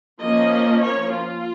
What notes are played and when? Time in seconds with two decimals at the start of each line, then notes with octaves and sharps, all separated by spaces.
0.20 F3 A#3 C#4 D#5
0.82 C#5
1.12 F4